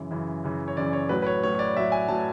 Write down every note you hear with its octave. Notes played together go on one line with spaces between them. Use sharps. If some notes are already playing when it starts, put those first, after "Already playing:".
Already playing: F#2 C#3 E3
F#2 C#3 E3
F#2 C#3 E3
C#5
F#2 C#3 E3 D5
C#5
A2 F#3 B4
B4
C#5
A2 F#3 C#5
C#5
D5
A2 F#3 E5
G#5
A2 F#3 A5